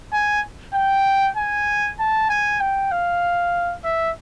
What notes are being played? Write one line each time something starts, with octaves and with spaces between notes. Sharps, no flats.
G#5
G5
G#5
A5
G#5
G5
F5
E5